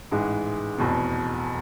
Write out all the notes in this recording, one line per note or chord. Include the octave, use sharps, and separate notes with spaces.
A1 G#2 E3 G#3
F1 E2 B2